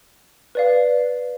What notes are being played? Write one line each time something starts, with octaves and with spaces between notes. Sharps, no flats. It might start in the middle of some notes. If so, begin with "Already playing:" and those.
B4 D5 F5